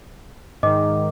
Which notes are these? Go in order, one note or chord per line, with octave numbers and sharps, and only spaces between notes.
G#2 D#3 D#5 D6